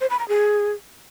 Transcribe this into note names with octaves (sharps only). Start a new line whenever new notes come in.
C5
B5
A#5
G#4